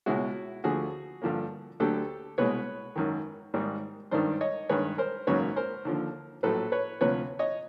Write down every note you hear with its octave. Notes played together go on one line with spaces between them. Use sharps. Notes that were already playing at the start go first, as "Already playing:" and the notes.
C#2 B2 G#3 E4 F#4
D2 D3 F3 F#4 G#4
G2 D3 F3 A#3
D2 D3 F#3 G4 A4
C2 B2 G#3 B4 C#5
G#1 F#2 D#3
G#1 G#2 D#3 G3
G#1 G2 D#3 C5 D5
C#5 D#5
G2 D#3 G#3 B4 C#5
A#4 C5
G#1 F#2 C#3 F#3 A#3 B4 C#5
A#4 C5
D#2 D3 F3
A#1 A2 F#3 A3 A4 B4
B4 C#5
D2 C3 F3 B4 C#5
C#5 D#5